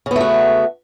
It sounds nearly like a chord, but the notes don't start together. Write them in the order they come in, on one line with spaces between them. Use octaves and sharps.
C#3 B3 A3 F#4